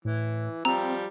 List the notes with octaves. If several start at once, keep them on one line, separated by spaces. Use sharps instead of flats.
A2 E3
F3 G3 C4 A#5